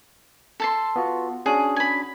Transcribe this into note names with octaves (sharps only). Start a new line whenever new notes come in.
A4 A5 C6
B3 F4 F#4
C#4 D4 F#4 G#4
G#5 B5